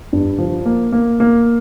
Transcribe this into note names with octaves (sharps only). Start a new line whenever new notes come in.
G2
F3
A#3
A#3
A#3